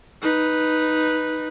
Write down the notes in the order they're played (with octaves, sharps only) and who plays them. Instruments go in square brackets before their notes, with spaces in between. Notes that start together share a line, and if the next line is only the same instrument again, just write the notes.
[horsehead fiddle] D#4 B4